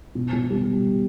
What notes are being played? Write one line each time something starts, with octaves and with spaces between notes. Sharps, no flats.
B2
B2
G3